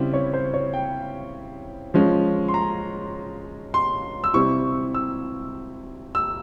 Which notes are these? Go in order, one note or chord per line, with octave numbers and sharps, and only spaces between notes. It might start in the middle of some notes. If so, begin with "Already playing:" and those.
Already playing: C#3 G3 C4 E4
C#5
C5
C#5
G5
F3 G#3 C#4
C6
A#5
C6
E6
C3 G3 C4 E4 C#6
E6
E6